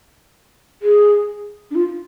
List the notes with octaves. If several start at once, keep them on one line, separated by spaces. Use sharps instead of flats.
G#4
D4
F4